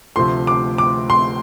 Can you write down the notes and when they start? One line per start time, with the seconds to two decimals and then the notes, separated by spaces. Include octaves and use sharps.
0.16 D2 C3 F3 A3 C6
0.47 D6
0.78 D6
1.10 C6